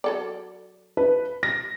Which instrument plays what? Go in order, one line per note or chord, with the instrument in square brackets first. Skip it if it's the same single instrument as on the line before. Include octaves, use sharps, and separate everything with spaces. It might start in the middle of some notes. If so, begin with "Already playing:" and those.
[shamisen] F#3 A4 D5
[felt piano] B4
A#6